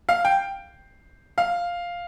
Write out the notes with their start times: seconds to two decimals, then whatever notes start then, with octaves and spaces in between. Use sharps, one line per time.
0.09 F5
0.25 G5
1.38 F5